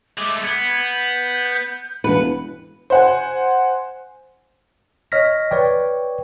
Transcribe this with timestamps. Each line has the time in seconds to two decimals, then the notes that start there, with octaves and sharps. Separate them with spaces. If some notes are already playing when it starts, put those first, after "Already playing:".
0.18 G#3 A3 D6
0.44 B3 G#6
0.83 G6
2.04 E1 B4 C#7
2.90 C5 F#5 G#5
5.12 C#5 D#5 F6 A#6 B6
5.51 B4 C#5 D5 G5